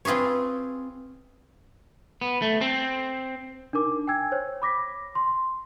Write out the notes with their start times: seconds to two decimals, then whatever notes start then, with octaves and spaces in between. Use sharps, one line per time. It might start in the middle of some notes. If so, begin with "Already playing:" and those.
0.05 C4 F4 G#4 B4 C#5
2.21 B3
2.42 A3
2.61 C4
3.73 D4 D#4 A#4 D6
4.07 G5 G#5 E6 G#6
4.32 C5 C#5
4.62 B5 D6 A#6 B6
5.15 C6